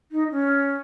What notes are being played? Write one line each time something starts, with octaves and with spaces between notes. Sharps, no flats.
D#4
C#4